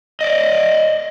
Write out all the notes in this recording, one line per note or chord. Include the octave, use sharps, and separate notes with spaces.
D5 D#5